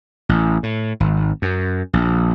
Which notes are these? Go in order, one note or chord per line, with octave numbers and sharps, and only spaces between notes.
A1
A2
G#1
F#2
A#1